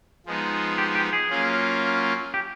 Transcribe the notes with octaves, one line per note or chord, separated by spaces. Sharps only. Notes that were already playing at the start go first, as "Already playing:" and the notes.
F3 G#3 B3 D#4
G4
G4
G#4
F#3 A#3 C#4 F4
G4